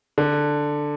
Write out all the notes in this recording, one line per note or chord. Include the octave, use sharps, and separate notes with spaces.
D3